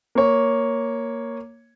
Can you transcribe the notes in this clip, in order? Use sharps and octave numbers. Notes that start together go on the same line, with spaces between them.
A#3 C#5